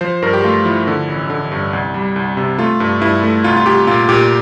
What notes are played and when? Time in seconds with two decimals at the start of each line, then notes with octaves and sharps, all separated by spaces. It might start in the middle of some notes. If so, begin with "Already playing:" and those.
0.01 F3 C5
0.22 G2 A#4
0.33 G4
0.44 A3 F4
0.65 F3 E4
0.87 D3
1.08 A1
1.30 D3
1.52 G2
1.73 C2
1.94 G3
2.16 C2
2.37 C3
2.58 A3 F4
2.80 G2
3.02 G2 E4
3.23 A3
3.44 C2 F4
3.57 F4
3.66 C2 G4
3.87 A#2 F4
4.09 A#2 G4